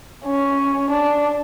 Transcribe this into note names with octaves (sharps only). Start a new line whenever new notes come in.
C#4
D4